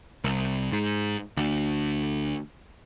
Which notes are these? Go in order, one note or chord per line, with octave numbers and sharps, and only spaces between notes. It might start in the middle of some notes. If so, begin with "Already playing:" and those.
C2
G#2
D2